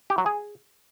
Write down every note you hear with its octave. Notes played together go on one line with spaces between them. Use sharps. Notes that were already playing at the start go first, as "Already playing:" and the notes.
G4
F#3
G#4